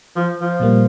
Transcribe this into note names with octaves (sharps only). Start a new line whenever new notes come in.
F3
F3
A#2 G3 A#3